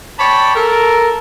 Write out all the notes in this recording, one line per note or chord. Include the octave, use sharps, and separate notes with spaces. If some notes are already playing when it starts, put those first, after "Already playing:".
C#5 D5 G5 A5 B5
A4 A#4